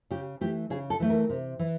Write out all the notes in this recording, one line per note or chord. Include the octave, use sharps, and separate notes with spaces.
C#3 G4
E3 A3 G4
C#3 G#4
A4
E3 A3
A#4
C3
E3